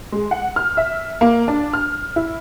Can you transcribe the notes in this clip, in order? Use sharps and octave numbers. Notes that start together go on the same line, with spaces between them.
G#3
F#5
F6
E5
A#3
D4
F6
E4